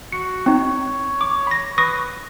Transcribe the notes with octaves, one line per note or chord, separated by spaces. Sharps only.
F#4 C#7
C4 D#4 C#5
D6
B5 A#6
B4 C#6 D#6 A#6